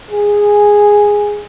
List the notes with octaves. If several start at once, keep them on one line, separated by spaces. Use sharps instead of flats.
G#4